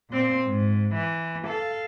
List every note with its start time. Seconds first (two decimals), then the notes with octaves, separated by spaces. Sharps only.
0.10 A#2 C4
0.46 G#2
0.94 E3
1.47 A4 F5